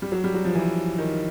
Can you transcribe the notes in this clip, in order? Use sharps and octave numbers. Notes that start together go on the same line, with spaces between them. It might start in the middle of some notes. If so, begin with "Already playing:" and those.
G3
F#3
G3
F#3
F3
E3
D#3